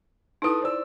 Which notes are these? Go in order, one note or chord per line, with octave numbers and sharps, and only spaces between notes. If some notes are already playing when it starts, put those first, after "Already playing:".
D#4 E4 A4 B4 D#6
C5 D5 E6